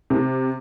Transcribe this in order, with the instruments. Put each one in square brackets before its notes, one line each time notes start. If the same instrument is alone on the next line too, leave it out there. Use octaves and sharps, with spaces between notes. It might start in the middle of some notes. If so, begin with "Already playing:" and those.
[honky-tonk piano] C3